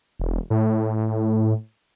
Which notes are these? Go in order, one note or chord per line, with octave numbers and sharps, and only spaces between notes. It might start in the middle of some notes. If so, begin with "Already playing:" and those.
E1
A2